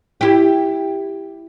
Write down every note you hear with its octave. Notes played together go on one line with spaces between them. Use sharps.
E4 G4